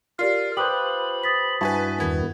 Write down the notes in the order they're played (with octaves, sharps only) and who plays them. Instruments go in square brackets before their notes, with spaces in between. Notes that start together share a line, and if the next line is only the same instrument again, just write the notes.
[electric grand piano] F4 [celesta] G4 D5 C7 [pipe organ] A#4
[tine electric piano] G4 B4 C5 [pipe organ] B5 [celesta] D#6 F#6
[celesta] D#6 A6 B6
[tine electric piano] G2 E4 F#4 [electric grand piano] B4 G#5 A5
[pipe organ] E2 D#3 [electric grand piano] B3 [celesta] G#6